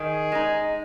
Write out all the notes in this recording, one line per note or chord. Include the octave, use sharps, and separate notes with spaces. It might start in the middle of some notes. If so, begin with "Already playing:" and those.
Already playing: D#3 G#4
G#3 D#4